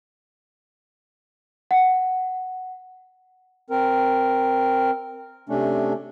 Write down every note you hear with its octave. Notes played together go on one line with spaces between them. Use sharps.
F#5
C4 A#4
C3 A3 C#4 D4